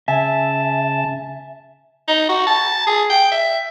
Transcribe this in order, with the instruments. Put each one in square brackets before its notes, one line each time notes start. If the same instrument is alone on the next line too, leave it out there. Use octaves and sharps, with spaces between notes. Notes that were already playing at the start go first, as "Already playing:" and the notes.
[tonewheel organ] C#3 A5 [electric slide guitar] E5 [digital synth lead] G#5
[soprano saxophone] D#4
F#4
A5
G#4
G5
E5